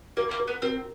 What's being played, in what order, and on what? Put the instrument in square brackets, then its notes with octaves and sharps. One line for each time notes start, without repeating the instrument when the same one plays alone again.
[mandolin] A#3 [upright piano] A#4
[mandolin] A#3
[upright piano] A#4
[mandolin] B3
[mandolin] C4 [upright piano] A#4